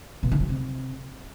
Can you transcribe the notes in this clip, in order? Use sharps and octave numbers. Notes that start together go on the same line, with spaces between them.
B2
D#3
F#3
C3